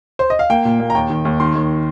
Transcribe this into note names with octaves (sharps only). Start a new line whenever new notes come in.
C5
D#5
F5
A#3 G5
A#2
A#3
A#5
D#2 G5
D#3
D#2
D#3 C6
D#2